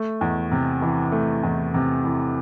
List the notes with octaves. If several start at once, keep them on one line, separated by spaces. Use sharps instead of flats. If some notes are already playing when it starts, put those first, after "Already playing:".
Already playing: A3
E2
C3
E3
A3
E2
C3
E3